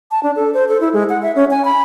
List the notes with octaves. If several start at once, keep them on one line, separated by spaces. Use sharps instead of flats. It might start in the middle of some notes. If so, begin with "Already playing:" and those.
A5
D4
A4
C5
A4
E4
G#3
F#5
E5
C#4
G#5
B5